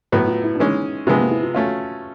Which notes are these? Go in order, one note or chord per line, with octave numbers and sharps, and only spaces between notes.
A2 F#3 B3 E4
F4
E4
D4
E3 G#3 C#4 D#4
C3 F3 G#3 B3 D4
A#3
E4
F4
A3 C#4 F4 F#4